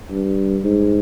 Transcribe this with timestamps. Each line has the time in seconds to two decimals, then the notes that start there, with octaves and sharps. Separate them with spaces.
0.11 G2
0.64 G#2